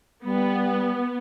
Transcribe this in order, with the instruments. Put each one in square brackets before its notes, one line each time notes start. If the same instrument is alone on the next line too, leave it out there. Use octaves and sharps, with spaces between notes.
[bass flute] G3 [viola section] B3